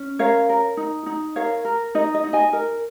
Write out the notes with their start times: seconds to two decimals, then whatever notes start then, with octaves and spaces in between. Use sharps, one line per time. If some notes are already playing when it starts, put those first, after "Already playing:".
Already playing: C#4
0.19 A#4 C#5 F5
0.49 A#4
0.77 D#4
1.06 D#4
1.36 A#4 C#5 F5
1.65 A#4
1.95 D#4 D#5
2.14 D#5
2.24 D#4
2.33 D#5 G#5
2.53 A#4